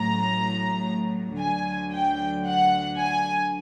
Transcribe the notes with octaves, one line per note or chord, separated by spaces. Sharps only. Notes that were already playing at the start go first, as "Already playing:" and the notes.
Already playing: A1 A2 F#3 A#5
D2 D3 F#3 G#5
G5
F#5
G#5